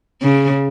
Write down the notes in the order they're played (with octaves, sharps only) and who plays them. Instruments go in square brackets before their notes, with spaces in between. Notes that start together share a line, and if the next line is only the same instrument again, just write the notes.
[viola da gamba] C#3